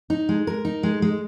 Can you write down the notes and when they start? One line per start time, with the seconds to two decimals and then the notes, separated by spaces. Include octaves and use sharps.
0.10 D#4
0.29 G#3
0.47 A#4
0.65 D#4
0.83 G#3
1.02 G#3